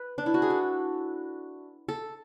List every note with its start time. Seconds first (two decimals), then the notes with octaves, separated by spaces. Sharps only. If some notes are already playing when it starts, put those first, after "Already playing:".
Already playing: B4
0.18 D4
0.26 E4
0.34 F#4
0.42 G#4
0.50 A4
1.88 A4